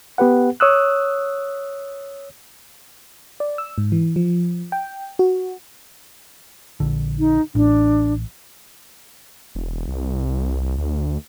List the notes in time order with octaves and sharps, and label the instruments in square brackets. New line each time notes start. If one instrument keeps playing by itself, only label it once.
[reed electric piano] B3 G4 B4 F#5
C#5 D#6 E6 F#6
[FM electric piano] D5
E6
G#2
E3
F3
G5
F#4
[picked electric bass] A#1 D3
[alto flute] D#4
[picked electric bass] A1 [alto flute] D4
[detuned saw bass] E1
C2
D2